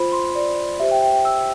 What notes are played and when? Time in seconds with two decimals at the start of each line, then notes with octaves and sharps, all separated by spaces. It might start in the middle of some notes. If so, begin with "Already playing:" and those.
Already playing: F4 C5 B5
0.12 C6
0.35 D5
0.80 G4 C5 E5
0.91 G5
1.03 G5
1.13 G5
1.25 E6